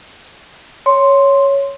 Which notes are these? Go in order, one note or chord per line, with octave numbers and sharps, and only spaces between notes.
C#5 C6